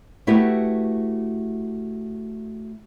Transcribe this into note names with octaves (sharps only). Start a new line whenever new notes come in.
A3 E4 F#4 G4 B4